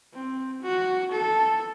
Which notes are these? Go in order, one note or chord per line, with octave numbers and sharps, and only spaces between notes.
C4
F#4
A4